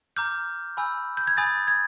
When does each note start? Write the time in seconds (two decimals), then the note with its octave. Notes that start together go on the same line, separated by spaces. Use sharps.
0.17 A#5 D6 F6 G6
0.77 G#5 B5 E6 G6
1.17 G6
1.27 G#6
1.37 G#5 B5 D#6 A6
1.68 G#6